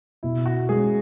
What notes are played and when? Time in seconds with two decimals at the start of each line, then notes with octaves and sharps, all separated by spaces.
0.23 B2 E4
0.46 F#4
0.69 G#3 C#4 G#4